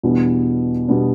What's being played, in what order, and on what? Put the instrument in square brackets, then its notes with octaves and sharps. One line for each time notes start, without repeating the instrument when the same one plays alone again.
[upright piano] E2 B2 G3 B3 D4
B2 G3 B3 D4